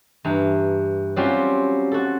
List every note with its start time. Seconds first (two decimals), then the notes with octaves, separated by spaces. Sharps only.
0.24 G2 E3 A#5
1.16 F#3 G3 C4 C#4 F4 G4
1.91 F#4 A4